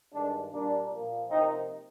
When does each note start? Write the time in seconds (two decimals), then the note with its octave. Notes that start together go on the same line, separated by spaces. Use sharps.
0.13 G2 D#3 G#3 D4
0.52 A#2 G3 A#3 D4
0.91 A#2 F3 A#3
1.29 C3 F3 A#3 C4 D#4